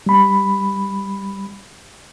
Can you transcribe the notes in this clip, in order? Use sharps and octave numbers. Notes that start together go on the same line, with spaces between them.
G3 B5